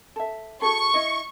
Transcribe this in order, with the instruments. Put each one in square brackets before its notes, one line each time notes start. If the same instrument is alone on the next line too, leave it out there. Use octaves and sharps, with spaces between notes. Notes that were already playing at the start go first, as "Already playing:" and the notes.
[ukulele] A4 E5
[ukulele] F#4 G#4 A4 [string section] C#6
[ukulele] E4 D#5